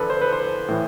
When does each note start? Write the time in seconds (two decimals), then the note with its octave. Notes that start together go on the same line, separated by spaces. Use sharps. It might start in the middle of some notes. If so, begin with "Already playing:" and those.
Already playing: E2 D3 F3 A4 B4
0.10 C5
0.22 B4
0.33 C5
0.69 A2 E3